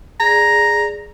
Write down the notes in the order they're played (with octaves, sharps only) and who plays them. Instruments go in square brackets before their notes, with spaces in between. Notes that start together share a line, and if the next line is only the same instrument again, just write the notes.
[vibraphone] G#4 D5 [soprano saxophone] A#5